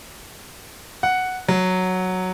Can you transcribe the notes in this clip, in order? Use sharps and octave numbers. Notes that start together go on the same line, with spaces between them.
F#5
F#3